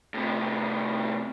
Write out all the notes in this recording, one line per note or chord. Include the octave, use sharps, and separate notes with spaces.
A2 C3